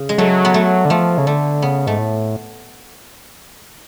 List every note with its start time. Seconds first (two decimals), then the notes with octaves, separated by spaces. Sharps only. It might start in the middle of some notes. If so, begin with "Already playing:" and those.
Already playing: C#3
0.09 G#3
0.18 F#3 A3
0.45 B3
0.54 A3
0.85 D3
0.90 F3 A3
1.18 C#3
1.27 D3 A3
1.62 C#3 B3
1.87 G#2 A3
1.98 A2